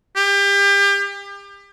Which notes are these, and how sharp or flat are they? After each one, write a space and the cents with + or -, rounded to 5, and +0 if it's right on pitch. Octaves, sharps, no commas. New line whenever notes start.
G4 +30